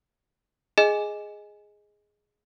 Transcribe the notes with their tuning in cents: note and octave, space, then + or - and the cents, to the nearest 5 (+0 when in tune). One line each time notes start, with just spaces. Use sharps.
G#4 +0 D#5 +0 G#5 +0